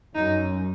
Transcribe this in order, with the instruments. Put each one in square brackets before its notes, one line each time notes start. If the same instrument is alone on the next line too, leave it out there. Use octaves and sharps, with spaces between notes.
[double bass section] F#2 [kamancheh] D#4